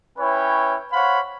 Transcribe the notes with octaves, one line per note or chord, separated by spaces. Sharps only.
C#4 E4 B4 C#5 G5
C5 C#5 F5 F#5 B5